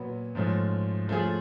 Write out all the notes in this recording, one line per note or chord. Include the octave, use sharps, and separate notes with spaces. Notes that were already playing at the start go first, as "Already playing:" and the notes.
Already playing: A#2 F#3 B3
G#2 F3 A3 C#4
F3 A3 C#4 F4 G#4